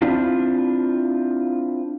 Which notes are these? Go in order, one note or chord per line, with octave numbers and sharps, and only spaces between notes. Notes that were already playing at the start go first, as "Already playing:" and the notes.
C4 D4 E4 F4